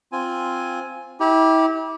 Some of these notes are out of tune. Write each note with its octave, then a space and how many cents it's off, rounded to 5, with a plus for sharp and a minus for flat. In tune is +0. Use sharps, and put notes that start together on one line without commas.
C4 +0 F4 +0 G#5 +0
E4 -35 G4 +0